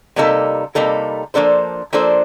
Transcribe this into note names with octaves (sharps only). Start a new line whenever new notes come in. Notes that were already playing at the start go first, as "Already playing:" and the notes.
C3 G3 A#3 D#4 A4
C3 G3 A#3 D#4 A4
F3 A#3 D4 A4 C5
F3 A#3 D4 A4 C5